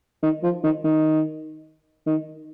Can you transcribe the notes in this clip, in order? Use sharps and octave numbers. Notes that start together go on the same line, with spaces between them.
D#3
F3
D#3
D#3
D#3